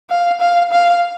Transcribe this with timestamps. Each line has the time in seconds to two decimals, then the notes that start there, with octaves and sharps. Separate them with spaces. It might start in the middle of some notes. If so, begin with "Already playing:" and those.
0.10 F5
0.41 F5
0.72 F5